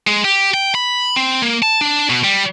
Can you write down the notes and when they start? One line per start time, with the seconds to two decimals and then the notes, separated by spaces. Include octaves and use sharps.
0.07 G#3
0.25 G4
0.54 G5
0.75 B5
1.16 C4
1.42 A#3
1.62 A5
1.81 D4
2.10 B2
2.24 G3